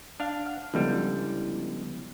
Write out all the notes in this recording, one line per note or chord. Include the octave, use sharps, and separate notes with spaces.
D4 F5
F#5 F6
C#2 D3 F3 G3 B3 E4